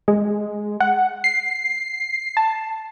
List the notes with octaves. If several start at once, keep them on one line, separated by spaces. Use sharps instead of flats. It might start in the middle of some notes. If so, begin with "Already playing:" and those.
G#3
F#5
C7
A5